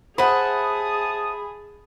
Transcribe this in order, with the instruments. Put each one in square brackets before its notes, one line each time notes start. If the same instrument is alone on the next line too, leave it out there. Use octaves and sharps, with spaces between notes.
[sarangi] G#4 [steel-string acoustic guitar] C5 E5 F#5 [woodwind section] A5 D#6 [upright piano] B5